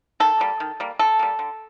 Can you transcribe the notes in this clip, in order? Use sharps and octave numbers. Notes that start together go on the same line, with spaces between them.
D#3 A4
G3 A#3
D#3
G3 A#3
D3 A4
G3 A#3
D3